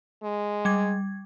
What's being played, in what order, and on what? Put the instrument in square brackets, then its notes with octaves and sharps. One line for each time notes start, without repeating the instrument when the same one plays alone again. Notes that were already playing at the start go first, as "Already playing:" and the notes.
[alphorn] G#3
[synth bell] G3 G#6